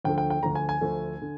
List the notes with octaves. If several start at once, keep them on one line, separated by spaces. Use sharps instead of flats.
D2 D3 F3 A3 G5
G5
G5
D2 D3 F3 A3 A#5
G#5
G#5
D2 D3 F3 A3
D3